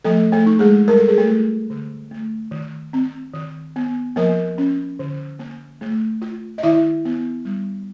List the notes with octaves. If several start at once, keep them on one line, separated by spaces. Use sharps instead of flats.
F3 A3 A4
A3 A4
D#4
G#3 G#4
G3 A#4
A4
G#4
A3 A4
F4
D3
A3
D#3
C4
D#3
B3
F3 A#3 A#4
C#4
D3
A#3
A3
F4
D#5
D#3 E4 E5
B3
G3